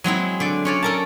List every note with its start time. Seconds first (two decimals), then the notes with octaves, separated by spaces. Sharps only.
0.04 F#3 G#3 C4 E4
0.40 D3 D5
0.65 C#4 C#5 D5
0.83 A4 A#4 A5